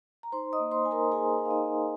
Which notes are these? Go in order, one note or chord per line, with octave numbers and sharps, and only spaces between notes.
A#5
D#4 C5 C6
D#5 D#6
A#3
C5 C6
D#4 G#5
A#4 A#5
A#3 G#4 G#5
D#4
F5
D#4 D#5
A#3